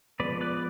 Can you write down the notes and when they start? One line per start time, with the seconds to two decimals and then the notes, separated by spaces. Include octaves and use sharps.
0.20 F3 G#3 B3 B4 D5
0.41 B4 D5